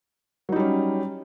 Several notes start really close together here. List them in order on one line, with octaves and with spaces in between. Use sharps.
F#3 D#4 G3 C#4